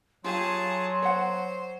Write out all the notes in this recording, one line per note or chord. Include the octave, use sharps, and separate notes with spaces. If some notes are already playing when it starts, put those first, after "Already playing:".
F#3 F4 G4 G#4 F5 A5 C6
C5 C#5 F#5